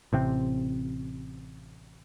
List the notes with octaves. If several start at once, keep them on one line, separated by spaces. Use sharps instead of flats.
A1 C3 C4